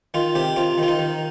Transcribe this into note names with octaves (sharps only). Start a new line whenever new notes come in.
D#3 F4
C3 G4
C3 F4
D#3 F4
D#4
D#3